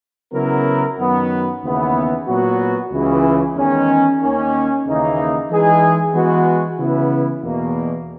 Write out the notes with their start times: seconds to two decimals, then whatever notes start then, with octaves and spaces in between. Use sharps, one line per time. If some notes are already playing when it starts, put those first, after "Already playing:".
0.33 C#3 F#3 B3 E4 A#4
0.98 F#2 D#3 F#3 B3
1.63 D#2 C#3 E3 B3
2.27 A#2 F#3 B3 F#4
2.92 C#2 C#3 E3
3.55 E2 D#3 G#3 C#4
4.20 D#2 D#3 A#3 C#4
4.85 D#2 C#3 E3 A#3 D#4
5.49 E3 G#3 D#4 G#4
6.14 E3 G#3 B3 F#4
6.78 C#3 E3 B3 E4
7.43 E2 B2 A#3